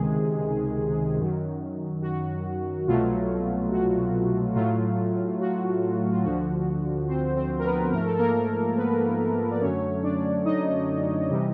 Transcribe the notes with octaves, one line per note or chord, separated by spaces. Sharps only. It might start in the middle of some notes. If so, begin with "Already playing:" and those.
Already playing: C#2 C3 D#3 G#3 G#4
F#2 D#3 F#3
F#4
C2 B2 F#3 A3 F4
F#4
A2 F#3 A3 F4
F#4
F4
D2 D3 F3 F#4
C4 C5
C4 C5
A#4
B3 B4
G#2 F3 A3 A#4
A4
A#3 A#4
B3 B4
D5
F#2 D3 F#3 A3 C#4 C#5
D4 D5
D#4 D#5
C3 E3 G3